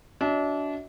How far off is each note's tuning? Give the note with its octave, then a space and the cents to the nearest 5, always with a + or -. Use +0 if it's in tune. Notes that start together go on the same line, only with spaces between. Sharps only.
D4 -30 F#4 +0 E5 -40